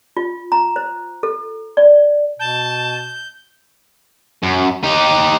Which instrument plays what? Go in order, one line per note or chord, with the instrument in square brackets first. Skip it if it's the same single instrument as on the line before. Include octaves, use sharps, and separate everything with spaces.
[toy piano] F4
A#5
C5
A4
D5
[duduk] B2 [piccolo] A5 [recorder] G6
[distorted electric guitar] F#2
D#4 G4